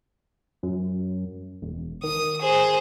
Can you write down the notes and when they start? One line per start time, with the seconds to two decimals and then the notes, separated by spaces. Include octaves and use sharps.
0.63 F#2
1.62 E1
2.04 D#3 D#6
2.41 G#4 C5